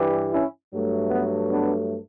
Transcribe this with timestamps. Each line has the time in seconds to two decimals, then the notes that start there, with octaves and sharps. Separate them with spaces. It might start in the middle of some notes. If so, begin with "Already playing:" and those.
Already playing: G2 E3 G3
0.33 C#4 E4
0.72 G2 F#3 A3
1.10 B3
1.50 B3 D4